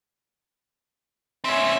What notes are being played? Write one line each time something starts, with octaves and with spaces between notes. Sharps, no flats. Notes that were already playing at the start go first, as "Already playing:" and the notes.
C4 C#4 E5